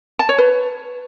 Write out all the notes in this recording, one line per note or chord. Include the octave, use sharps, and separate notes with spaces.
A5
C#5
B4